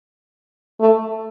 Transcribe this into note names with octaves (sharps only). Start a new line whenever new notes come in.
A3